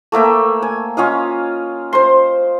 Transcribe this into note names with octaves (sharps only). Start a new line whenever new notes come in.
A3 A#3 E5 G5
G#5
C#4 F4 D#5 F5
C5 C6